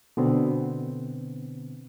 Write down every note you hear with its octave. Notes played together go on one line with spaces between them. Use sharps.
B2 D3 B3 C4